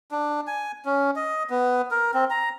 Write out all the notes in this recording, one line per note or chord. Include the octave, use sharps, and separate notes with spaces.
D4
G#5
C#4
D#5
B3
A#4
C4
A#5